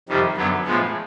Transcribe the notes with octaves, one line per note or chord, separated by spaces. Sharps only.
F2 C3 D#3 G3
F#2 D3 F#3 B3
A2 F3 G#3 B3